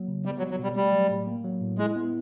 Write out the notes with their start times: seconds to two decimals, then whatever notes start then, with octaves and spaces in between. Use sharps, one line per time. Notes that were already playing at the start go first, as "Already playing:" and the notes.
Already playing: F#3 A#3
0.08 C#3
0.25 G3 B3
0.38 F#3
0.42 G3
0.51 F#3
0.59 B2 G3
0.76 G3 A3
0.93 F#3
1.10 A2
1.27 A#3
1.44 F#3
1.61 A2
1.78 G#3 E4
1.96 B3